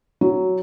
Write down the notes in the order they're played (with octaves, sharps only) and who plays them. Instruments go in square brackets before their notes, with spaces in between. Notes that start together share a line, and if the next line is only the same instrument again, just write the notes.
[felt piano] F#3